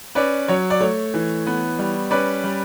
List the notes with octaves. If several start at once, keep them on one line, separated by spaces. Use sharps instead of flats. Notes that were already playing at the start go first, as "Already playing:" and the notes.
C#4 B4 D5
F#3 C#5
D5
A3 C#5
E3
B3
G3
C#4 B4 D5
G3